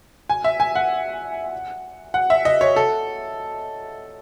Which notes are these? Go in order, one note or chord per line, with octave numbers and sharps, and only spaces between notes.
G#5
E5
G#5
F#5
F#5
E5
D#5
C#5
A4